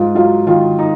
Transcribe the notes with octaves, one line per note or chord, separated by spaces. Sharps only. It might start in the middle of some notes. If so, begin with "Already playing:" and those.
Already playing: G#2 F4
F#3 F4
D#3 F4
D#4